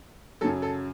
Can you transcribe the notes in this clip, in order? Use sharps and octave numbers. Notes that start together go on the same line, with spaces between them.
F#2 C#3 F#3 A4
A4